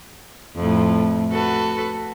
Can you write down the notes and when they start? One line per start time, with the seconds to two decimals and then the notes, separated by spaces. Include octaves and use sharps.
0.56 F2 A2
1.32 F#4 A4 B4